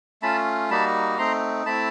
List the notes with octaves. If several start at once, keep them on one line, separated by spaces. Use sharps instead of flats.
A3 C#4 F4 A5 B5
G3 A#3 D#4 F#4 A5 B5
A3 C4 D#4 A#5 C6
A3 C4 E4 A5 B5